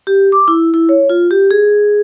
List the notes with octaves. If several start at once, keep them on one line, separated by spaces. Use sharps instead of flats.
G4
D6
E4
E4
C#5
F4
G4
G#4